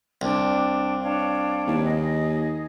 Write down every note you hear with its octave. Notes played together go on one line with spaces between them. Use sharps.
C2 D4
D4 C#5 F5
D#2
G#4 D#5